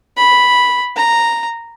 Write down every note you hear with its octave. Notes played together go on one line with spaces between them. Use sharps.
B5
A#5